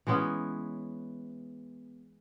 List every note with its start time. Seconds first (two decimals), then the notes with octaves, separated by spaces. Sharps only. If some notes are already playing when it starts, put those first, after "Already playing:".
0.07 E3 G#3 B3 C#4